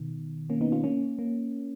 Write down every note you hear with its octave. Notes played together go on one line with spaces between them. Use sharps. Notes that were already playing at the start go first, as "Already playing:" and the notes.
Already playing: B2 D#3
A#3 C#4
B3 D#4
C#4 F4
A#3 C#4
A#3